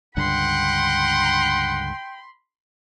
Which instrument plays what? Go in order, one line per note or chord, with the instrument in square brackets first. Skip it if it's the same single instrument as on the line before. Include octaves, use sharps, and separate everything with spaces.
[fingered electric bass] C#2 G2 D3 [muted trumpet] F#5 [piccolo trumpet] G5 [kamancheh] B5 C6